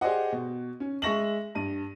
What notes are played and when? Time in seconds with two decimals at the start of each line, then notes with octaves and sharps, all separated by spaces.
0.01 G4 G#4 C5 D5 D#5 F#5
0.32 B2
0.80 C#4
1.02 G#3 E5 C#6 A#6 E7 F#7
1.55 G2 D#7